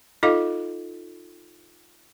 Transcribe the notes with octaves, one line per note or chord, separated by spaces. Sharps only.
D#4 F4 A4 D#5 F5 D6